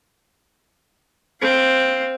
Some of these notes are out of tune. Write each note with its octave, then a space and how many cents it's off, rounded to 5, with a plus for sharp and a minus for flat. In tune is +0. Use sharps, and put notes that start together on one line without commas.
C4 +0 F5 +0